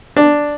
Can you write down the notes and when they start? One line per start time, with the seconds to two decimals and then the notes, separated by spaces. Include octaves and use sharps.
0.17 D4